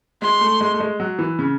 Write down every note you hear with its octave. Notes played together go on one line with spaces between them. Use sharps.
G#3 C6
A3
G#3
A3
G#3
F#3
E3
C#3